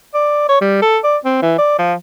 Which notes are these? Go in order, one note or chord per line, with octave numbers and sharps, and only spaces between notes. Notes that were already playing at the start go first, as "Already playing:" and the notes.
D5
C#5
G3
A4
D5
C4
E3
D5
F3